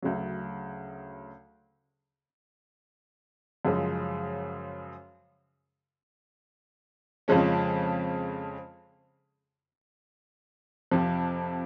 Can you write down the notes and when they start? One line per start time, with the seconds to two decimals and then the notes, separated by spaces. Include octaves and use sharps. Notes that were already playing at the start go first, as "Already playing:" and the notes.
0.02 D2 C#3 F#3
3.65 F#2 C#3 F3 G#3
7.28 F2 C#3 F3 G#3 C#4
10.91 F2 C3 F3